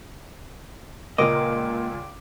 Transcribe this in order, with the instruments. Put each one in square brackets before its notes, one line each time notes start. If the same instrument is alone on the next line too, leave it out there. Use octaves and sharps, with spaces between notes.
[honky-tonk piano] C#2 A#2 [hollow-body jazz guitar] A#3 D#5 [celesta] A#4 [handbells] D6 D7